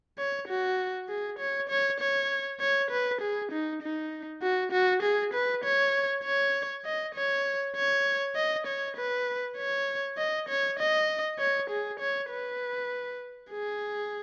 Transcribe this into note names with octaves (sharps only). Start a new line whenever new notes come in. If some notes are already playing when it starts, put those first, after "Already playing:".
C#5
F#4
G#4
C#5
C#5
C#5
C#5
B4
G#4
D#4
D#4
F#4
F#4
G#4
B4
C#5
C#5
D#5
C#5
C#5
D#5
C#5
B4
C#5
D#5
C#5
D#5
C#5
G#4
C#5
B4
G#4